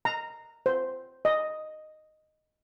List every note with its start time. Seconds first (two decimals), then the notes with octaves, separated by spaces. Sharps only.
0.05 A#5
0.66 C5
1.25 D#5